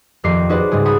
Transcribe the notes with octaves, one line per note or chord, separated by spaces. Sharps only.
D#1 F2 G4 A#4 D6 C7
D#4 F#4 G#4 B4 C5 D5
C#2 G#2 G3 G#4 D7
F#5 G#5 B5 D#6